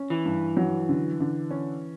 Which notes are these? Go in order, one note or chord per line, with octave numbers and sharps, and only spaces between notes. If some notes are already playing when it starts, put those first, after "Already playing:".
Already playing: C#4
E3
G2
F#3
D3
D3
C#4